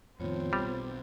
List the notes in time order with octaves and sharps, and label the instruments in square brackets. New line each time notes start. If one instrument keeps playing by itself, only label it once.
[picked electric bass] F2 A2 D#3 [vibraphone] B3 F4 C#5 [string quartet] C4
[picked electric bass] B1 [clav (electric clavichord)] G3